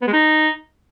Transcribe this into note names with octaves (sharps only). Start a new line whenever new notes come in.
B3
G#3
D#4